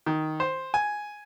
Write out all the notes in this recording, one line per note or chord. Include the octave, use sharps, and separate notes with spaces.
D#3
C5
G#5